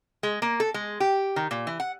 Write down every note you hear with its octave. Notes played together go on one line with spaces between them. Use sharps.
G#3
A#3
A4
G#3
G4
D#3
A#2
E3
F#5